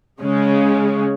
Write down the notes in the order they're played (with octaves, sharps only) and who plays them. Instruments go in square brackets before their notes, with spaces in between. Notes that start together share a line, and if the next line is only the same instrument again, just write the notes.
[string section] C#3 G#3 C#4